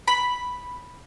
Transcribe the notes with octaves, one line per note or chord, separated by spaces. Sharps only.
B5